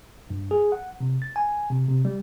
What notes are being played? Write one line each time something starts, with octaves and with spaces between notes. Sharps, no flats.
G2
G#4
F#5
C3
A6
G#5
C3
C3
G3